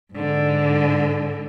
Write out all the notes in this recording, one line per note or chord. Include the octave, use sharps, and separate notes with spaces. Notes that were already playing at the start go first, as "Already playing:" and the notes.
G#2 D3